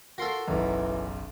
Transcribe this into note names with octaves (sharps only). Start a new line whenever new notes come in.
F4 F#4 A4 A#4 C6
F#1 B1 E3